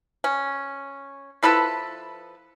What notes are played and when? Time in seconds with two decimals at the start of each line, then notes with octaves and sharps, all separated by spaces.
0.24 C#4
1.43 F3 E4 A4 B4